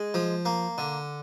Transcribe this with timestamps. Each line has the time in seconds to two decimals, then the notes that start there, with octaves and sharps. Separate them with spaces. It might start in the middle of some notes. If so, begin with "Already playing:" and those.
Already playing: G#3
0.14 F3
0.45 A#3
0.78 D3